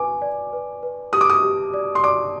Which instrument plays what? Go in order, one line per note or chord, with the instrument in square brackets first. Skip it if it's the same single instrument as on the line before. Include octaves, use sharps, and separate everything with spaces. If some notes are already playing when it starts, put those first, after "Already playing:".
Already playing: [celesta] B4 G#5 [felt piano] D6
[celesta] D5
B4
B4
[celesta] G4 [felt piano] D#6
[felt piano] D6
D#6
[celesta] G4
D5
[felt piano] C6
[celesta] D5 [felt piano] D6